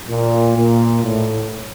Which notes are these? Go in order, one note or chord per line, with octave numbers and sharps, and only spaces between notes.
A#2
A#2
A2